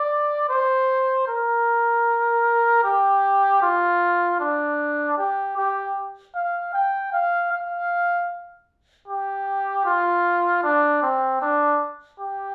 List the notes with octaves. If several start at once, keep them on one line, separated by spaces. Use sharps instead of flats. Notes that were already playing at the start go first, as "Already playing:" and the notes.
Already playing: D5
C5
A#4
G4
F4
D4
G4
G4
F5
G5
F5
F5
G4
F4
D4
C4
D4
G4